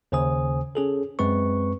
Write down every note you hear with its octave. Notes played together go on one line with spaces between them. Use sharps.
D#2 C#3 C5 G#5 D#6
C#4 G#4 A4
F#2 G#3 C4 B4 C#6